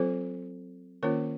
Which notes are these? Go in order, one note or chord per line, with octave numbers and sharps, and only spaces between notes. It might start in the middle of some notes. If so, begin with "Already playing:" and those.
Already playing: F#3 C4 F4 A4 C5
D#3 A#3 C#4 F4 A#4 C#5